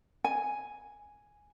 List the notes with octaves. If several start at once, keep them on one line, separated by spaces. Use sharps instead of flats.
G#5